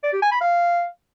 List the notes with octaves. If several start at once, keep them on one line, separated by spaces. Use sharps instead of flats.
D5
G4
G#5
B5
F5